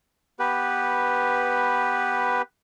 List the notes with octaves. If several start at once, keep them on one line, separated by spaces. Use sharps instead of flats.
B3 G4 B4